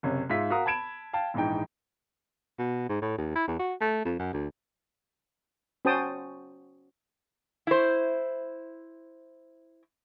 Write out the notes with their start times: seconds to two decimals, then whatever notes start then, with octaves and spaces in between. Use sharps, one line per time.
0.03 F#1 C3 C#4
0.30 G#2 F4 E5 B6
0.50 F#4 A#4 F5 A#5 D#6
0.66 A5 B5 G#6 D7 E7
1.13 F5 G5 A5
1.34 A#1 G#2 E3 D#4 G5
2.59 B2
2.89 G#2
3.02 A2
3.18 D#2
3.35 E4
3.48 E2
3.59 F#4
3.81 A3
4.05 F2
4.19 F#2
4.33 D2
5.85 C#4 F#4 C5 G5 A5 D#6
7.67 E4 C5